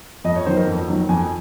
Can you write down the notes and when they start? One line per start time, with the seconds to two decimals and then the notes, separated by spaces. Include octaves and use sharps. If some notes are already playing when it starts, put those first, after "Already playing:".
0.24 F2 D#5
0.36 C#5
0.46 D#3 F#3 C5
0.57 A#4
0.67 F2
0.88 D#3 F#3
1.09 F2 G#5